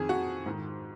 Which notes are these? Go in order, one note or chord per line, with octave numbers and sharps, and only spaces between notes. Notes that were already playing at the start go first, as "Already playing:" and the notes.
Already playing: F2 D#3 G#4
F#4
G#2 D#3